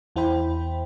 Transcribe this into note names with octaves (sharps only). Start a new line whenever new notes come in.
E2 E4 C5 G5 B5